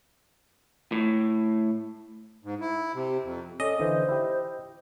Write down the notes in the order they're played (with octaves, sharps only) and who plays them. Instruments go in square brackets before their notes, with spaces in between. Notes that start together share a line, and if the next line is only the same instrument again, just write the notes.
[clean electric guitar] A2
[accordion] G#2
E4
C3
F2
[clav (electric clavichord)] C#4 D5 [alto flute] A4 [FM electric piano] D#5
[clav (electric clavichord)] D3 E3 [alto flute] C5
[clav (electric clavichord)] E4 G4